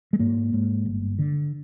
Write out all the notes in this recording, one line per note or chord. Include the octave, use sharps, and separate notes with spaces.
G#3
G#2 A#3
G#2
G1
D3